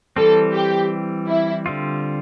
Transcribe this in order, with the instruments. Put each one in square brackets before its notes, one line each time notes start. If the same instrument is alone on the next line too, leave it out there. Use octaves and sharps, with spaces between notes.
[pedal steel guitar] E3 G3 C4 [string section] A4
[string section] G4
E4
[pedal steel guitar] D3 G3 C4 F4